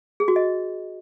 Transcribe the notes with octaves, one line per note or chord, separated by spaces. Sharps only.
G#4
F#4
D#5